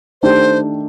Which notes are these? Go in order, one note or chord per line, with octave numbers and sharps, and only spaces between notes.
D#3 A3 D4 G4 C5